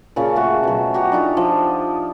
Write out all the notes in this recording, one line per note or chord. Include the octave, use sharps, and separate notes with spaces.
A#2 C#3 C#4 A5
A3 A#3 F#4
B2 F#3
F#4 G4 A#5
D4 D#4 F4 A4
F3